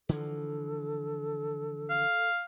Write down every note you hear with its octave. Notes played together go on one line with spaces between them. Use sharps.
D3 E3 F3 A4
F5